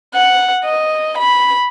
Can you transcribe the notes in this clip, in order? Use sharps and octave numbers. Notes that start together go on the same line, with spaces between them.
F#5
D#5
B5